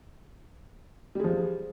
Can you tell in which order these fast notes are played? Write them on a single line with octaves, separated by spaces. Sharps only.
G3 G#3 F3